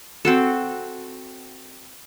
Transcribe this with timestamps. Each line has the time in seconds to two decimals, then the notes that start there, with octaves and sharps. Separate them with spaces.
0.25 C4 F#4 A4